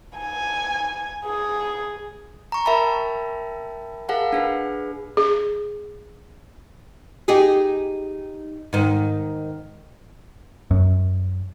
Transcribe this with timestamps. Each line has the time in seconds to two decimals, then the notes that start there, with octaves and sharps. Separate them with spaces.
0.18 G#5
1.25 G#4
2.52 A#5 C#6
2.65 A#4 E5 G5 A5 B5
4.09 G#4 A#4 F5 F#5 A5
4.33 D4 G#4 B4
5.17 G#4
7.28 D#4 G4 G#4
8.73 G#2 D#3
10.71 F#2